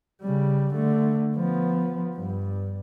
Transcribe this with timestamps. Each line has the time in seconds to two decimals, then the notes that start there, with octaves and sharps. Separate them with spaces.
0.21 C#3 G3
0.74 D3 A3
1.36 F3 B3
2.15 G2